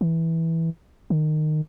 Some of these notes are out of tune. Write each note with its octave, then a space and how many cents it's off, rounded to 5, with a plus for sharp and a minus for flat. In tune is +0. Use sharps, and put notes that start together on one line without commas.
E3 -10
D#3 -20